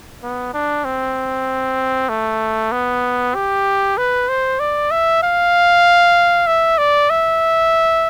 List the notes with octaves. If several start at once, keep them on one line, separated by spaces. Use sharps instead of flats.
B3
D4
C4
A3
B3
G4
B4
C5
D5
E5
F5
E5
D5
E5